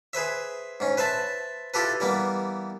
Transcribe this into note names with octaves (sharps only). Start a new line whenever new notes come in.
G#4 B4 C5 E5
G#2 C#4
B4 C5 E5 A5 B5
E4 F4 G4 A4 B4
E3 G3 A#3 B3